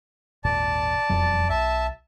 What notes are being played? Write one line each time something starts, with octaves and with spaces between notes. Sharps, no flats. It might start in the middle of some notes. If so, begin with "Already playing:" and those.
G#1 D#2 A#2 D5 A5
E1 F2 F#3
B1 E5 A5